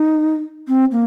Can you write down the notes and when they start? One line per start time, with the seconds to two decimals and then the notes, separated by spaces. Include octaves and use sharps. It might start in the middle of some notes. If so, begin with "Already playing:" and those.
Already playing: D#4
0.68 C4
0.92 A#3